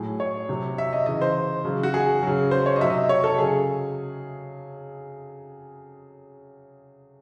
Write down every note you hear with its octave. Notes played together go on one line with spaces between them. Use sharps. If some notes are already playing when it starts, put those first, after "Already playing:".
Already playing: A2 F#3 G#4
C#5
C3 F#3
E5
D#5
C#3 E3 D#5
C5
C#3 F#3
F#4
G#4
C#3 F#3
C5
C#5
D#5
C3 F#3 E5
D#5
C#5
A4
C#3 F#3 G#4